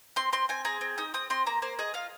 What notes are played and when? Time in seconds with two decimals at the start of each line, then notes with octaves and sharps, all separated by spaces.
0.16 C4 C6
0.33 C4 C6
0.49 C4 G#5
0.65 G#4 A#5
0.81 C4
0.98 D#4 D#6
1.14 C4 D#6
1.30 C4 C6
1.46 A#3 A#5
1.62 A#3 C5
1.79 G#4 D#5
1.94 F4 F5